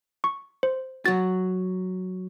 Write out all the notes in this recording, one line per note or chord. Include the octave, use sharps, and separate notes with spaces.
C#6
C5
F#3 F#4 A6